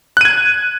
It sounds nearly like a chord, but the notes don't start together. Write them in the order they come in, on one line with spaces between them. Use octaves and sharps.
F#6 D#7 G#6